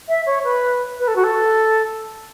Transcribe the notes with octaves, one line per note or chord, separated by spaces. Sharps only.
E5
C#5
B4
B4
A4
F#4
A4